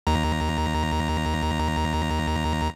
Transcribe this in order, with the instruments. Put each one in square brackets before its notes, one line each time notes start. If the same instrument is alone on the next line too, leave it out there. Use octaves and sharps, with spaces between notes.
[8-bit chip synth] D#2 A#5